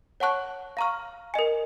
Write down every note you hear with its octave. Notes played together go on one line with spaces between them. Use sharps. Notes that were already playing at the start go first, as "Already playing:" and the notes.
C#5 F#5 A5 C#6 F#6
F5 A#5 C#6 F6
A#4 D#5 G#5